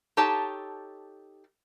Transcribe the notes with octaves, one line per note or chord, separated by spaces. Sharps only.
D#4 G4 A4 C#5 A5